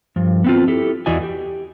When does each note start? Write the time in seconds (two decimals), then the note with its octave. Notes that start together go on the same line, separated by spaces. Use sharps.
0.16 G2 F3
0.44 B3 C4 F4
0.68 E4 G4 A4
1.06 E2 E3 F#4 D5 D#5 G#5
1.23 G4